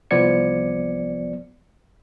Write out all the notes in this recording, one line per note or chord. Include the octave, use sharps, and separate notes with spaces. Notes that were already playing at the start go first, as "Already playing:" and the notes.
C2 F3 B3 D5 G#6 C#7